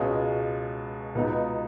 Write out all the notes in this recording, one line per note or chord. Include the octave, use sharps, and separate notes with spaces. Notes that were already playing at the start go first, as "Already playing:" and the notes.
Already playing: C#2 B2 G#3 C#4 G#4
C#2 B2 B3 D#4